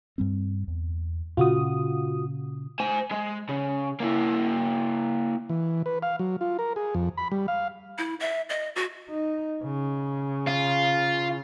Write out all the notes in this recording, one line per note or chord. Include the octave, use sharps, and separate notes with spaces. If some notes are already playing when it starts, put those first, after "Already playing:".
G2 G3 C4
E2
A#2 C#3 F4 F#4 D#6
C5 G#5
G#3
C#3
A#3 E4
E3
B4
F5
F#3
F4
A#4
G#4
F2
B5
G3
F5
E4
E5
D#5
F#4
D#4
C#3
F4